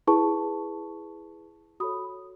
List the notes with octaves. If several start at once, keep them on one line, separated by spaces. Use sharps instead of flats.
E4 G#4 B4 A5 C#6
F#4 A4 C#5 B5 D#6